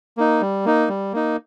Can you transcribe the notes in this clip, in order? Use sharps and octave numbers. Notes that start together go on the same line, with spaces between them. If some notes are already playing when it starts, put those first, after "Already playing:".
A#3 D#4
G3
A#3 D#4
G3
A#3 D#4